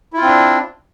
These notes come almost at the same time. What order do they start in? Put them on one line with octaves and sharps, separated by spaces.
E4 F4 C4 D4